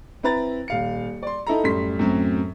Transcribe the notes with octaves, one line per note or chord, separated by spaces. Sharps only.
C4 E4 B4 A#5 A6
D#1 F5 C#7
D5 C6
D#4 E4 A4 A#5
F#2 A2 G3 A3 C6 B6
F#2 A2 F#3 C4 C#4